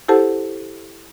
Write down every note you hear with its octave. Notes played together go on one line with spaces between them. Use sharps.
E4 G4 A4 C5 F#5 A5